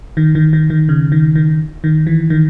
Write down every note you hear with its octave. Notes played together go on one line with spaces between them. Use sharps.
D#3
D#3
D#3
D#3
C#3
D#3
D#3
D#3
E3
D#3